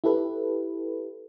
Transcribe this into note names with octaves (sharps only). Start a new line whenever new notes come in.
E4 G4 A4 B4